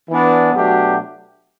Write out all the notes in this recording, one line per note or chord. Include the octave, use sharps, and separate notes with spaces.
E3 B3 D4
B2 F#3 A3 D4 G4